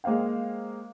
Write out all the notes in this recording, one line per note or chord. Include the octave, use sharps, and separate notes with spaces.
G#3 A#3 C5 F5 G5